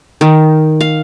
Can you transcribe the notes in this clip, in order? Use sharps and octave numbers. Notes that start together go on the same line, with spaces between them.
D#3
F5